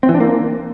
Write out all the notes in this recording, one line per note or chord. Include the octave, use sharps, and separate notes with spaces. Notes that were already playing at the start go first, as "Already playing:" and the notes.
C4
E3
D4
A#3